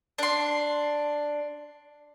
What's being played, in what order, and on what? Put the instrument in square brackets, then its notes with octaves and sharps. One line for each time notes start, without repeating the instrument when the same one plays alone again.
[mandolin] D4 C6